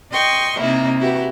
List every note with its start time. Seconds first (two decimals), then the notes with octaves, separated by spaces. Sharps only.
0.11 D#5 G5 C6 C#6
0.60 C3 A#3 D#4 E4
0.99 E4 F#4 G4 B4